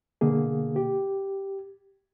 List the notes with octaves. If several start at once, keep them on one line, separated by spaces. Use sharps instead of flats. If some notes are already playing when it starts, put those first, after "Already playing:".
B2 D3 A#3 G#4
G4